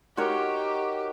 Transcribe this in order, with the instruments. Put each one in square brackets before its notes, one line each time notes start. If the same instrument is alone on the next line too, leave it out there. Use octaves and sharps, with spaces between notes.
[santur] D#4 F#4 A#4 C#5 [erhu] G4